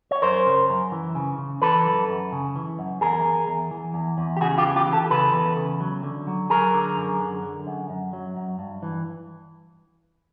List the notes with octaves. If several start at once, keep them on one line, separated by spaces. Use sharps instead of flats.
C#5
F#2 A#4 C5
C#3
F#2
E3
C#3
C#3
E3 A4 B4
F#2
F#2
C#3
E3
F#2
E2 G#4 A#4
E2
E2
E3
E2
E2
G4
C#3 F#4 G#4
F4 G4
E3
F4 G4
E3
G4 A4
C#3 A4 B4
E2
C#3
F#3
D3
F#3
F#3 G#4 A#4
D3
F#2
D3
D3
F#2
F#2
F#3
F#2
G2
E3